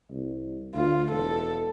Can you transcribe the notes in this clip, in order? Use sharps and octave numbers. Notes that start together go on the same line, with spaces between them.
C2
D2 F4
E1 A4